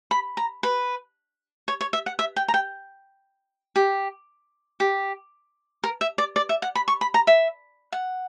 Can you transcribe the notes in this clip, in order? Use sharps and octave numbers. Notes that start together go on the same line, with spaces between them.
B5
A#5
B4
C#5
C#5
E5
F#5
E5
G5
A#5
G5
G4
G4
A#4
E5
D5
D5
E5
F#5
B5
C#6
B5
A#5
E5
F#5